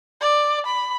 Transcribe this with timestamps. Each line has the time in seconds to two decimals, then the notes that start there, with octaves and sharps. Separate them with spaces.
0.21 D5
0.66 B5